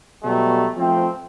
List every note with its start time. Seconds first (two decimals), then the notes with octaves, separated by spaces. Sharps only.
0.24 B2 F#3 G3 A3
0.76 F3 A3 C4